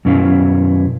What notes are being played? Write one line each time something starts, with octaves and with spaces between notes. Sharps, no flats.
F#2 B2 C#4 E4 F5